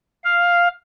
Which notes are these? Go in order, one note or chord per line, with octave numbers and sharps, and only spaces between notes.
F5